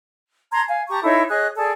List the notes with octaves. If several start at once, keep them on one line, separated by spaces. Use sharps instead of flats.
A5 A#5 C6 G#6
F5 G#5
G4 A5 A#5 C#6
D#4 E4 A4 C#5
G#4 C#5 D#5 F#6
G#4 A4 D5 A5